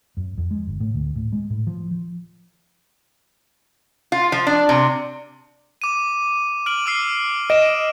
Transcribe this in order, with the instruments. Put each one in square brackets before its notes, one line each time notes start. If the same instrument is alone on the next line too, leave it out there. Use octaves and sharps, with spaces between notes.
[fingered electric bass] F#2
F2
G#3
G1
A2
D2
A2
G#3
A2
F3
F3
[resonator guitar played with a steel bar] F4
F3
D4
C3
[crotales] D6 D#7
F6 D7 F#7
D6 E6 C7
[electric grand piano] D#5 [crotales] D7 E7